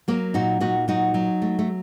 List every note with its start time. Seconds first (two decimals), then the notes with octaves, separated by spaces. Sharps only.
0.08 F#3 A#3
0.34 A#2 D#4 F#4
0.60 A#2 D#4 F#4
0.88 F#3 D#4 F#4
1.14 F#3
1.42 A3
1.59 A3